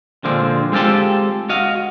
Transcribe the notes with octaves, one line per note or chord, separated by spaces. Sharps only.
A#2 D3 F3 G#3 C4
G#3 C4 F4 G4 A4
F#4 D#5 F5